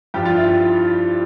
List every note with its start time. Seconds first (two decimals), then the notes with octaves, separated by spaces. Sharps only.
0.14 G2 F3 G4
0.25 F4
0.37 E4
0.48 F4